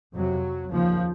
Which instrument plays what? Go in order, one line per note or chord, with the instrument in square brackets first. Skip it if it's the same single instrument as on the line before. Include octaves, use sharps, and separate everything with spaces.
[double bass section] F2 C3 F#3
D#2 C#3 F3